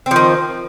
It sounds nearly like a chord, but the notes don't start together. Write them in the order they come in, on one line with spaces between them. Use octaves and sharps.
C4 F3 D#3